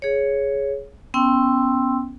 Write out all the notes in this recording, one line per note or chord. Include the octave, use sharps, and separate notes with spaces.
G#4 C#5
B3 C#4 G5 C6 E6